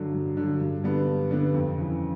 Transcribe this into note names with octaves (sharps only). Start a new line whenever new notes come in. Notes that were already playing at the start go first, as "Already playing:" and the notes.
Already playing: G2 D3 F#3
G2
D3 F#3
G2
D3 G3 B3
G2
D3 G3 B3
F2
C#3 E3